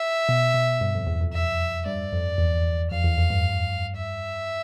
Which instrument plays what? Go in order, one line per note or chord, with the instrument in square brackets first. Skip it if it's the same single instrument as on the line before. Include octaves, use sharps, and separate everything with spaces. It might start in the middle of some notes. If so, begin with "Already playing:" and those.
Already playing: [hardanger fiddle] E5
[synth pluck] B2
B2
G2
F2
E2
F2
[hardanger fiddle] E5
[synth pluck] G2 [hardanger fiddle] D5
[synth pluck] F2
E2
[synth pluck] F2 [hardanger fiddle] F5
[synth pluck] E2
F2
G2
[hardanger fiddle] E5